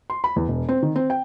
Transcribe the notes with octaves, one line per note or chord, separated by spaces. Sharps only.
C6
B5
E2
E1
C4
D#3
C4
G5